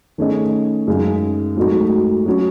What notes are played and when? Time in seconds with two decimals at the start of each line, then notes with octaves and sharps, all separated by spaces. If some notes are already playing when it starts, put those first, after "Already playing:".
0.18 D#3 A3 C#4 G#4 D#5
0.87 F#2 C#3 G#3 D#4
1.56 G#2 F#3 A3 D#4 F#4
2.26 F#3 C#4 F#4